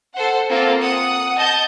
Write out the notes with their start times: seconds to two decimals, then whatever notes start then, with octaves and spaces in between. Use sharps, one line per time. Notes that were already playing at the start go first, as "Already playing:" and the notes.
0.15 A4 C5 F#5
0.49 A#3 C4 F4 A4
0.83 F#5 D#6
1.37 D#5 A5 G6